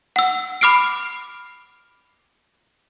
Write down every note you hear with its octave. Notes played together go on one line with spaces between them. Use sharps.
F#5 E6
B5 D6 F6 C7 D7